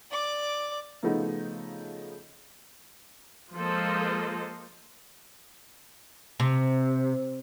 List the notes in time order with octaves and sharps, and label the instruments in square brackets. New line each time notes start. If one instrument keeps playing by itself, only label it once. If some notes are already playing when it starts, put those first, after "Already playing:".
[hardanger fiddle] D5 D6
[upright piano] C#3 F3 A3 B3 D#4
[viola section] F3 G#3 A#3 A4 C5 D#5
[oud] C3